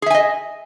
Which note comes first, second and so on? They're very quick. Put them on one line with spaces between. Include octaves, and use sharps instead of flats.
G#4 E5 G#5 D#5